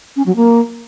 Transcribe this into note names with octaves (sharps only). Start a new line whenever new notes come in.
C#4
F#3
A#3